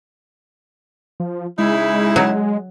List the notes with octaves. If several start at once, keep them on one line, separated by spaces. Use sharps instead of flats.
F3
C#3 G#3 D#4 E4
F#3